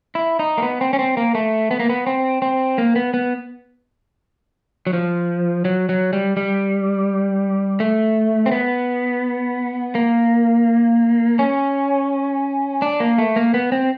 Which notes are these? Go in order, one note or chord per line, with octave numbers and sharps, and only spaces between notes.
E4
D#4
A#3
B3
C4
C#4
C4
A#3
A3
B3
A#3
B3
C4
C4
A#3
B3
B3
F#3
F3
F#3
F#3
G3
G3
A3
C4
B3
A#3
C#4
D4
A#3
A3
A#3
B3
C4